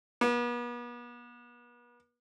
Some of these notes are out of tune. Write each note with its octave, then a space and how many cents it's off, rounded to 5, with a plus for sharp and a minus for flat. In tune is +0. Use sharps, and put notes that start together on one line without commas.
B3 -40